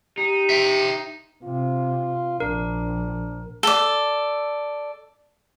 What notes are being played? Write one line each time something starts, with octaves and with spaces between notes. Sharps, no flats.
D#4 G4
E5 G5
C3 F4
A#1 D4 A#4
A4 D5